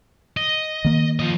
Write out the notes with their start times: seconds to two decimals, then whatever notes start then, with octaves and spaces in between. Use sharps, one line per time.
0.37 D#5
0.84 D#3 A#3
1.19 F3 D#5